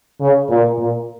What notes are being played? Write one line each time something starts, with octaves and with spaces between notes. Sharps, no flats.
C#3
A#2
A#2